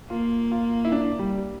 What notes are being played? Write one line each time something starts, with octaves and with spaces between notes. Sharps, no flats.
A#3 F4
F4
E4
D4
G3